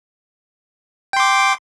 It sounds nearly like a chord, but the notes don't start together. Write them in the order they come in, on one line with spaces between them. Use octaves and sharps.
G5 C6 D6